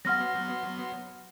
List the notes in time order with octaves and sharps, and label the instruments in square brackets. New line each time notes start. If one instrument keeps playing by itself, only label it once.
[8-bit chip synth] F#3 B3 C6 [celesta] F#5 F6 A#6